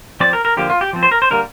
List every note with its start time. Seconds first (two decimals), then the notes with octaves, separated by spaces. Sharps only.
0.20 F3 C4 D5
0.33 A#4
0.45 A#4
0.57 D3 F3 A#3 G4
0.70 F4
0.81 G4
0.93 F3 C4
1.03 C5
1.11 A#4
1.22 C5
1.31 D3 G3 A#3 A#4